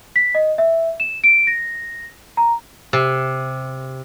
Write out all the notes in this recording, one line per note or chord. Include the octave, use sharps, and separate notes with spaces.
B6
D#5
E5
E7
D7
A#6
A#5
C3